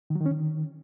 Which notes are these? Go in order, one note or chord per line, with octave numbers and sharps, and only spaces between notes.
D#3
F#3
D#3
C#4
D#3